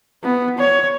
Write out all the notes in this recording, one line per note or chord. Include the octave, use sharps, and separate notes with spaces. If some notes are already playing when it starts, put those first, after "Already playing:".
B3
C#5